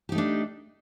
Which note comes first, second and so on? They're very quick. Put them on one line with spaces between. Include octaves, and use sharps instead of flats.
G4 D#4 A3 D4